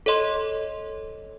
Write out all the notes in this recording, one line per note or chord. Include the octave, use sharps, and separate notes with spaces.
A4 C#5 D#5 C6